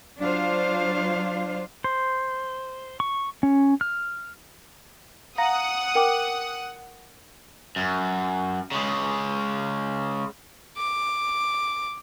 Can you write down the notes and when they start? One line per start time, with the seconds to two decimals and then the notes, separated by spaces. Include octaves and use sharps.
0.20 F#3 D4 F4 C5 F5
1.84 C5
3.00 C#6
3.43 C#4
3.81 F6
5.38 F5 F#5 A#5 D#6 A#6
5.95 A#4 G5 D6
7.76 F#2
8.72 C#3 G#3
10.77 D6